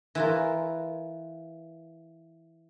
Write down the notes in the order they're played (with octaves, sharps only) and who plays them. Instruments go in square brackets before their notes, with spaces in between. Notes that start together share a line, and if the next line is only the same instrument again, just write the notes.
[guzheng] E3 F4 A#4